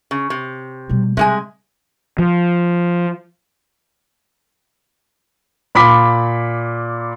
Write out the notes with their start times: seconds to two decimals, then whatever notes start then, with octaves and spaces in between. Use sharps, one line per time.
0.11 C#3
0.30 C3
0.89 B2 G3
1.17 C3 G3 G#3 G#5
2.19 F3
5.75 A#2 B5 D6 B6